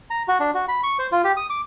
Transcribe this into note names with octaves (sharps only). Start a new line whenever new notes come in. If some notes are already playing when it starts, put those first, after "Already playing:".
A#5
F#4
D4
F#4
B5
C#6
C5
F4
G4
D#6
D6